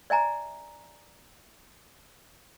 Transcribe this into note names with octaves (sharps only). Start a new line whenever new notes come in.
D5 E5 G#5 A#5